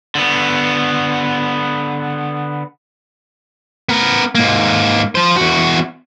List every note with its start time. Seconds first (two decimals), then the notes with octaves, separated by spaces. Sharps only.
0.15 D3 B3
3.89 B3 A#4
4.35 G#2 A#3
5.15 F3 C5
5.36 E2 F#4